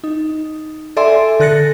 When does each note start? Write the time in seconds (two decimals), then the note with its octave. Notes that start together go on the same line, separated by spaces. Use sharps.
0.04 D#4
0.97 A4 D5 E5 G#5 C6
1.40 D3 A4 F#6 A6 A#6 C#7